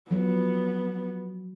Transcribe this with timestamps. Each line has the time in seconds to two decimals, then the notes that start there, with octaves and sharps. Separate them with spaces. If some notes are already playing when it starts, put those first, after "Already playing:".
0.11 F3 F#3 B3